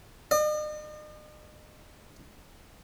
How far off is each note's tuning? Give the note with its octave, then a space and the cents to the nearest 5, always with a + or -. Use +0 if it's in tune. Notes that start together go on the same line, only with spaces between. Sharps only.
D#5 -45